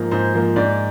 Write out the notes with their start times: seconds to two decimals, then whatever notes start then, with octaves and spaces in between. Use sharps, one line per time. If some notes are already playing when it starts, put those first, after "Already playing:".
Already playing: G#2 F3 A#3
0.11 G#2 C5
0.34 F3 A#3
0.56 G#2 D5